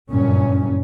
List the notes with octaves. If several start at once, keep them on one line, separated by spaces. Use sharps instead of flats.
F#1 G2 A#2 C#4